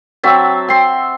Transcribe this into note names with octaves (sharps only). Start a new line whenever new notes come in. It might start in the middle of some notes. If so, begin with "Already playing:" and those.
F#3 C4 E5 A5
C4 C6